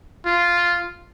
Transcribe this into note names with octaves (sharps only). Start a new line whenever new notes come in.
F4